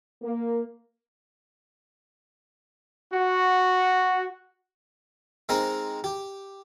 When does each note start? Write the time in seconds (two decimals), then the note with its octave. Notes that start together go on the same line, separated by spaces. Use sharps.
0.22 A#3
3.14 F#4
5.49 G#3 C4 D#4 A#4
6.04 G4